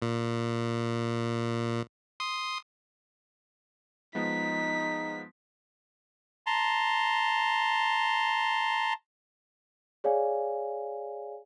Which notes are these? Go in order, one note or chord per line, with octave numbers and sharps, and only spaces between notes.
A#2
C6 D#6
F3 G#3 B3 D#4 B6
A5 A#5 C6
G#4 C#5 D5 F5 G#5